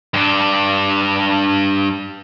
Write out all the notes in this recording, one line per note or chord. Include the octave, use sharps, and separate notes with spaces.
G2 D4